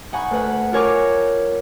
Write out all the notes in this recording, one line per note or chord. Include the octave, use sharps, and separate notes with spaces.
D#4 F#5 G#5 B5 C#6
D2 B4 F#5
F4 A#4 C#5 G#5 C#6 D6